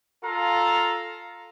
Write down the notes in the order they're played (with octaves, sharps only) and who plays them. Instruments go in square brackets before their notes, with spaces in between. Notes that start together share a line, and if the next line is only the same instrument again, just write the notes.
[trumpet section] F4 A4 F5 A#5